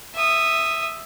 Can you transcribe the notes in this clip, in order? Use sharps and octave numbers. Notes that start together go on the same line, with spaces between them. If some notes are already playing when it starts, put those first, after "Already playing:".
E5 D#6